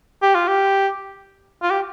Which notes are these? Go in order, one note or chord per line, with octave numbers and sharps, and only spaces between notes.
G4
F4
G4
F4
G4